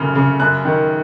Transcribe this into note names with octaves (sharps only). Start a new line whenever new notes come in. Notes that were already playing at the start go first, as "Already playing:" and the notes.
Already playing: F#2 C#3 F6
C#3
F#2 F#6
D#3